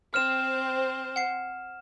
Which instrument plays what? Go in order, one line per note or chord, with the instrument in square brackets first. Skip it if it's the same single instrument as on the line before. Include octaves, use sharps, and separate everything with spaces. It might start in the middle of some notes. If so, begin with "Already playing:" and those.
[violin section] C4 C5 [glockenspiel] F6 E7
[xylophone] F#5 C7